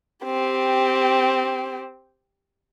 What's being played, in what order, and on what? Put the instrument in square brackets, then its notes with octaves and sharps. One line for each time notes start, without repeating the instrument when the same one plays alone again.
[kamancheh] C4 G4